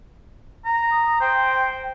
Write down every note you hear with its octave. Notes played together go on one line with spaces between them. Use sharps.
A#5
D#6
C5 G5